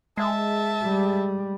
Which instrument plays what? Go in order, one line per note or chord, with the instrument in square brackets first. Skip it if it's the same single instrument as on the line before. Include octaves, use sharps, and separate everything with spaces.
[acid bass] G#3 [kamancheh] E5 A5
[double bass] G3